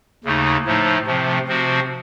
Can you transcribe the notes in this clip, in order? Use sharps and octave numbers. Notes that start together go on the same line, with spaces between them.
D#2 C#3 A3 D#4
A2 F3 A3 D#4
C3 F3 A3 C4
C3 F3 C4 F#4